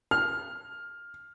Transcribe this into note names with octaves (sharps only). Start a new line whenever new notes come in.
F6